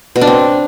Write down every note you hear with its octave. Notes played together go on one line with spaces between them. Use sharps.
B2
D4
C4